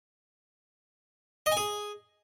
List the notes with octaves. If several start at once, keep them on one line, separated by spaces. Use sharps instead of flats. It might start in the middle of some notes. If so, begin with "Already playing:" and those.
D#5
G#5
G#4